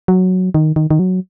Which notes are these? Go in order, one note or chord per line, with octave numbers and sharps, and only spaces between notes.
F#3
D#3
D#3
D#3
F#3